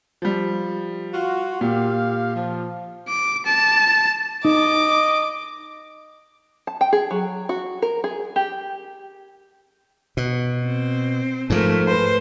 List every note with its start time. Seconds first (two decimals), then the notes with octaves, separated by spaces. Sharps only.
0.22 F3 G3
1.12 F4 F#4
1.61 A#2 G4 F5
2.34 F3
3.08 D6
3.46 A5
4.45 D#4 D#5 D6
6.67 A5
6.81 G5
6.93 G#4
7.11 F#3
7.49 F#4
7.82 A#4
8.04 G#4
8.36 G4
10.17 B2
10.65 C4
11.50 G#2 F3 A3 A#4
11.87 B4 C5 C6